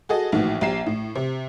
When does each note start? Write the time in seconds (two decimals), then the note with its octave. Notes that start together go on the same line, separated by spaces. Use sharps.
0.09 F#4 G#4 A4 D#5
0.32 A#1 A2 D#3 E3 F#4
0.61 A#1 G4 A#5 C7 E7
0.87 A2
1.16 C3